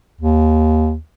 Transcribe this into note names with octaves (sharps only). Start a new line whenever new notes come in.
D#2